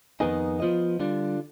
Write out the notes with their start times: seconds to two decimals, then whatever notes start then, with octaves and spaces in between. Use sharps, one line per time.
0.20 F2 D#3 B3 D#4 G#4
0.60 F3 B3 F4 C5 D#5
1.00 D3 G3 D4 F4